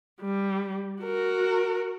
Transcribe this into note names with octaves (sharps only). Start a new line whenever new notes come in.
G3
F#4 A#4